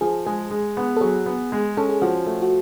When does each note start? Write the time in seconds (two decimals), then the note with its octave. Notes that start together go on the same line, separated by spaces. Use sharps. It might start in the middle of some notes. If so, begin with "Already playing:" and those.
0.01 F3 G#4
0.26 G#3 G#4
0.51 G#3
0.77 B3
0.97 A4
1.01 F#3 G#4
1.26 B3
1.52 G#3
1.77 C#4 A4
1.89 G#4
2.02 F3 F#4
2.26 A3
2.42 F#4